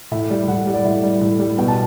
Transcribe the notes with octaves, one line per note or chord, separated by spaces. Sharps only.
A2 E5
G3
A2 F#5
G3
D5
A2 E5
G3
A2
G3
B2 G5
A5